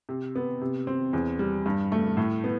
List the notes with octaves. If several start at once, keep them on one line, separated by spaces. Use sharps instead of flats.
C3
B3
C3
C4
E2
G3
G2
A3
A2
B3